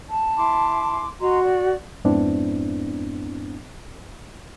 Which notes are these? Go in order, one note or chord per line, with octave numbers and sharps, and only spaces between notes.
A5
E4 C6 D6
F#4 D#5 A#5 C6
D5
F2 G#2 B3 C4 D4 E4